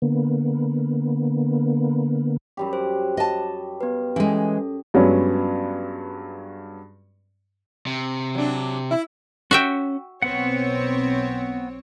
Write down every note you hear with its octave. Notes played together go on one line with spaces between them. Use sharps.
D3 A#3 B3
F#2 G3 G4
C5
D#5 A5
B3 B4
E3 G#3 C#4 A4
G2 F#3 G#3 B3 C#4
C3
F#3 D4
E4
C#4 F#4 E5 G5
B1 B3 C4 C#5 F#5